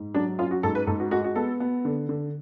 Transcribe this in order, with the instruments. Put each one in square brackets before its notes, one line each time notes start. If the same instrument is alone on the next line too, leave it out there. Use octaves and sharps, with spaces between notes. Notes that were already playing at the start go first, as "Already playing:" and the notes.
Already playing: [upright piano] G#2
[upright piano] F#3 [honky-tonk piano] D4
[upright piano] C#4 [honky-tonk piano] F4
[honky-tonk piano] F#4
[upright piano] G#2 [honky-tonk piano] A4
[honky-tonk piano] B4
[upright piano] G#2 [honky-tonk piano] A4
[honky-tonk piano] F#4
[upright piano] G#3 [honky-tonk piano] F#4
[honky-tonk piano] F#4
[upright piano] B3 [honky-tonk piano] A4
[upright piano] B3
D3
D3